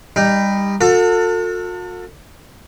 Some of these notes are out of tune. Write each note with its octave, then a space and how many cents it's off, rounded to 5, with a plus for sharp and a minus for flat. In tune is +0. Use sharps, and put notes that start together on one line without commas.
G3 +20 D#4 +0
F#4 -45 A4 +35